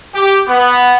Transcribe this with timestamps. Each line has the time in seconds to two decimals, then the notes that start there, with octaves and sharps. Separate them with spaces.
0.13 G4
0.48 B3